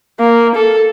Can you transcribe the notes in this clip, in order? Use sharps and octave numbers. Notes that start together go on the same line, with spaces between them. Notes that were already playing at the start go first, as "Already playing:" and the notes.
A#3
A4